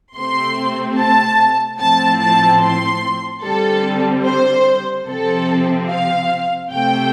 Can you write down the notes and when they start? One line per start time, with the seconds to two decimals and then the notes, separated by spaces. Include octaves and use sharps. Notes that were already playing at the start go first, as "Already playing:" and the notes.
0.16 C3 A3 C4 C6
0.98 A5
1.80 A2 F3 C4 A5
2.20 A5
2.62 C6
3.44 D3 G3 C4 A4
4.26 C5
5.08 C3 F3 C4 A4
5.90 F5
6.72 C3 A3 C4 G5